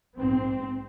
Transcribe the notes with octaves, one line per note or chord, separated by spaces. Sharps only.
A#1 G#2 C4